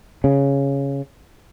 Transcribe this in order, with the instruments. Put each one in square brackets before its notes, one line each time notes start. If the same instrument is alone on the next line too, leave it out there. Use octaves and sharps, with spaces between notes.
[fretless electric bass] C#3